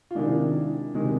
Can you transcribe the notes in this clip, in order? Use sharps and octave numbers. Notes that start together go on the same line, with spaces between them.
F4
C3 D#3 G#3 D4 E4
C3 D#3 G#3